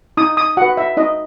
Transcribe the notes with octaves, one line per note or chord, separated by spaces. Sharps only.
D#4 D#6
D#6
F#4 B4 F#5
E5
D#4 D#5